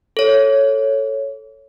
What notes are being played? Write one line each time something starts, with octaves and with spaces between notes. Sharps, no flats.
A4 C#5